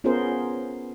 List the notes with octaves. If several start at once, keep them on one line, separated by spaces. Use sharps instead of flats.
B3 C#4 F4 G#4 A#4 C5